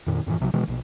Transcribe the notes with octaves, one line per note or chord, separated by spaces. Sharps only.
F2 A#2 D#3
F#2 A2 D#3 E3
B1 C3 F3 F#3
B2 D#3 E3 G#3
A#1 B2